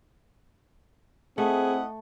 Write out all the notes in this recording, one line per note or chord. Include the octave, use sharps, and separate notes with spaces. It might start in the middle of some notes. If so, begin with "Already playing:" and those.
A3 C4 E4 G#4 D#5 F#5